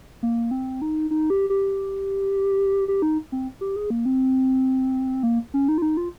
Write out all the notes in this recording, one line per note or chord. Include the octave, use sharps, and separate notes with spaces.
A#3
C4
D#4
D#4
G4
G4
G4
D#4
C4
G4
G#4
A#3
C4
A#3
C#4
D#4
F4
D#4
F4